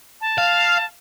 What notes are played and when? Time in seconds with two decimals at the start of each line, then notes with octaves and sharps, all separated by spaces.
0.21 A5
0.38 F5